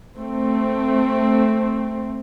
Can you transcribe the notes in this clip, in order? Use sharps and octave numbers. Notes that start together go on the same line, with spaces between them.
A3 C4